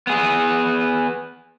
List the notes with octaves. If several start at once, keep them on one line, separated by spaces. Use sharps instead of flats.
B3 G#4